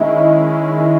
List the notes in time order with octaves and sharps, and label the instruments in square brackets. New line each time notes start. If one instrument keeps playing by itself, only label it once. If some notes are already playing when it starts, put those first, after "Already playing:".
Already playing: [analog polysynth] D#3 G#3 C#4 E4 [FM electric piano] D#5 E5